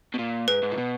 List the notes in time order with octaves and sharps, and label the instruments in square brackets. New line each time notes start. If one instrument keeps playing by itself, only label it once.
[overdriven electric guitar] B2
A#2
[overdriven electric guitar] G#2 [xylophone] B4
[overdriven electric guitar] G#2
A#2
B2